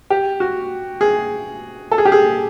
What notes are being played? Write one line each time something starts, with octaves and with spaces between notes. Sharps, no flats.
G4
F#4
G#4
A4
G#4
G4
G#4